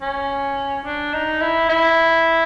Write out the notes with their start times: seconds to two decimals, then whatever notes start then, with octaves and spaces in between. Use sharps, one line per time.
0.02 C#4
0.85 D4
1.14 D#4
1.41 E4
1.69 E4